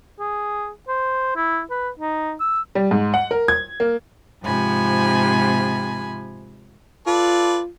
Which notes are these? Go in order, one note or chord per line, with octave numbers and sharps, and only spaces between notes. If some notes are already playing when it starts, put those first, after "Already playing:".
G#4
C5
E4
B4
D#4
E6
G3
G#2
F#5
A#4
G#6
A#3
G#2 C3 F3 G#5 B5
F4 A4 B4 D5